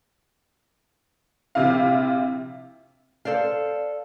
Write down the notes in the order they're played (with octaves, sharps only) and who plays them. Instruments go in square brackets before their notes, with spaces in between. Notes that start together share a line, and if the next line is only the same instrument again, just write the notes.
[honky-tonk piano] A#1 C3 E4 F5
[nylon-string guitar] A4 C5 D5 F5